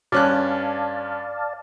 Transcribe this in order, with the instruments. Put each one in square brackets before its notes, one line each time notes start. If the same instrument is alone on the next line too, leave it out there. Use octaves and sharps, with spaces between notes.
[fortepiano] G2 C#4 F#6 [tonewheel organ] D5 F5 A5